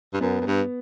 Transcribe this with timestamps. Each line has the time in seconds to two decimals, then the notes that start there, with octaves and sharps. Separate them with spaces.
0.13 G2
0.21 F#2 B3
0.41 F#2
0.46 G2